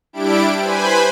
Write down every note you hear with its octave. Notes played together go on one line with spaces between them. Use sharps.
G3 D4 E4 G4 D7
B4 C5 G#5 B5